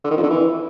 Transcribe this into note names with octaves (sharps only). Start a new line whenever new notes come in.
D3
D#3
F2
D3
E3